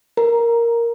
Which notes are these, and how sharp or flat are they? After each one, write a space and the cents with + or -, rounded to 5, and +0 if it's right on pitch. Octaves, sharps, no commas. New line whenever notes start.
A#4 +0 A#5 +10